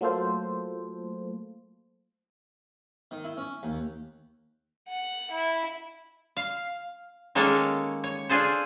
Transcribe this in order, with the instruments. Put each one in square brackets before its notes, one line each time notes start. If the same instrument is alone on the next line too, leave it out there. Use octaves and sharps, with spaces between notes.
[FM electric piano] F#3 A3 A#3 F4 A4 C5
[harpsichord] D#3
E4
C#4
D#2
[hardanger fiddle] F#5
E4
[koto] F5
D#3 G#3 A#3 C#4 A4 C#5
C#5
D4 F4 G#4 A4 C5